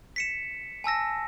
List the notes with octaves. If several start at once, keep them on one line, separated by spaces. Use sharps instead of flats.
B6 C#7 E7
G#5 A5 E6 A#6